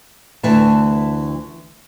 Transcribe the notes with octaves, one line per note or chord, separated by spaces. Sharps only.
D2 E3 A5